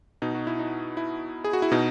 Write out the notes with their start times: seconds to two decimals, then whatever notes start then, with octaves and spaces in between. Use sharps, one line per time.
0.22 B2 D#4
0.35 F#4
0.47 E4
0.59 D#4
0.97 E4
1.44 G#4
1.53 F#4
1.62 E4
1.72 B2 D#4